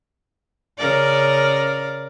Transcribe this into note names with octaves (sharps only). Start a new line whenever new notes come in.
C#3 A#4 D5